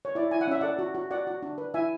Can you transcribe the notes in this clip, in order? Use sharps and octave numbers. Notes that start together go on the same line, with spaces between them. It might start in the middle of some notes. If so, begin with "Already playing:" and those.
C#5
E4 D5
E4 G#5
F#5
C#4 E5
A4 D5 F#5
F#4
F#4
F#4 D5 F#5
F#4
D4
B4
E4 E5 G#5